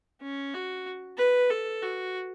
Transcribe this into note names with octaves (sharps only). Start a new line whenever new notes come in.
C#4
F#4
B4
A4
F#4